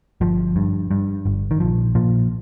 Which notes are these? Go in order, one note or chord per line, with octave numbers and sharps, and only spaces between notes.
G1 F3
G2
G2
G1
D#3
A#1 F3
A#2 F3